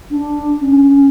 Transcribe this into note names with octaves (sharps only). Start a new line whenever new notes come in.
D4
C#4